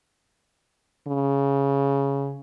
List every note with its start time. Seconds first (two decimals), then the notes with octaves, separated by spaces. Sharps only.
1.08 C#3